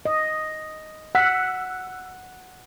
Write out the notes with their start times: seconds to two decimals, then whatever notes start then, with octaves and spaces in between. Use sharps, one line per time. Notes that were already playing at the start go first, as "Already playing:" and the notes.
0.05 D#5
1.15 F#5 E6 F#6 B6